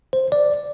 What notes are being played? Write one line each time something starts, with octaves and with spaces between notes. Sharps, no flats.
C5
D5